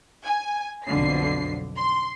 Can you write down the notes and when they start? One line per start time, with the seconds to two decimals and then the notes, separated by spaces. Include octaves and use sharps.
0.25 G#5
0.86 B1 F2 D3 C7
1.78 C6